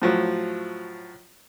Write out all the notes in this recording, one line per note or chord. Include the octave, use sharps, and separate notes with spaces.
A2 F3 F#3